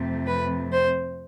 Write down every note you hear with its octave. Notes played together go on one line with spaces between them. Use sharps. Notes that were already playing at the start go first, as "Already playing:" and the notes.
Already playing: F2 C3 F3 A3
B4
C5